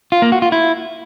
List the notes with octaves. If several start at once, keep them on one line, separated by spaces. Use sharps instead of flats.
F4
A#3
F#4
F4
E4